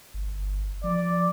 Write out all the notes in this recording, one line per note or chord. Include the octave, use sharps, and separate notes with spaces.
G1
F3 D5